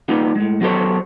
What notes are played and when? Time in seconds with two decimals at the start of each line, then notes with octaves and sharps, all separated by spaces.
0.08 G3 A#3 B3 D#4 F4
0.35 A2 G#3
0.61 F#3 B3 G4 A4 C5 C#5